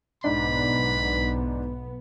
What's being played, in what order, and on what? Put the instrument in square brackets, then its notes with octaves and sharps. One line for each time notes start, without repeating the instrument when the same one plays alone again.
[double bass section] B1 B3 [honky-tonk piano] G#2 D4 [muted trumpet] B5